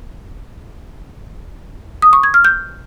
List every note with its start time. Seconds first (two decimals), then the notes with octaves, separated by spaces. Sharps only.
2.02 D#6
2.13 C#6
2.23 G#6
2.34 F6
2.45 G6